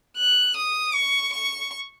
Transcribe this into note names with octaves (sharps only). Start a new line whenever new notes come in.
F#6
D#6
C#6
C#6